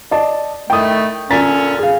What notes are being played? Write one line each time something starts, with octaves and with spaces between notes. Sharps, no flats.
D5 D#5 A5
A2 D#3 A3 G5 D#6
A#2 D3 C#4 A#5 A6 B6
G#4 F5